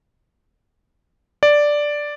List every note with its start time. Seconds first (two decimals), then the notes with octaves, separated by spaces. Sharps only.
1.43 D5